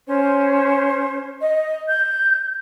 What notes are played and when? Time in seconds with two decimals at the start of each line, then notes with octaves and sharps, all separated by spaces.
0.07 C#4 C5
1.42 D#5
1.88 G6